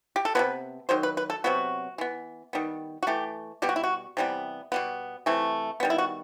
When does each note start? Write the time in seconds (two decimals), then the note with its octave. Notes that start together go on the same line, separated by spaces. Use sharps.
0.16 G4
0.25 A4
0.35 C3 F#3 B3 B4
0.89 D#3 F#3 C5
1.03 B4
1.17 B4
1.30 A4
1.44 C3 F#3 B3 F#4
1.98 E3 B3
2.53 D#3 G3 B3
3.03 F#4
3.07 E3 A3 G4
3.62 B2 G3 B3 G4
3.69 F#4
3.76 E4
3.84 F#4
4.17 C3 E3 G3 B3
4.72 B2 G3 B3
5.26 C3 E3 A3
5.80 D#3 G3 B3
5.90 E4
5.98 F#4